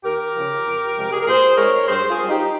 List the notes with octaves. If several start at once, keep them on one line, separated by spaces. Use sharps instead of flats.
D#2 G4 A#4
C#3 F3
F2
C3 F3 G#3
G#4
A#4
A#2 G#4 C5
G#3 C4 D#4 A#4 C#5
G2 G#4 C5
F4 G#4
G3 C4
D#4 G4